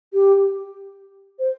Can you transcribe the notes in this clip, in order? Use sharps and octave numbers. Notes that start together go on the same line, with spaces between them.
G4
C5